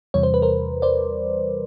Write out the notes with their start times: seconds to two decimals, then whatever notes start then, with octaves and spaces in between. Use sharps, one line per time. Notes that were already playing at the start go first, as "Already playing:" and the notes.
0.14 E2 C3 E3 G3 C#5
0.23 C5
0.34 B4
0.42 A#4 C5
0.82 C5 D5